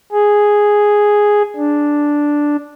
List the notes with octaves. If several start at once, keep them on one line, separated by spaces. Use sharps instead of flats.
G#4
D4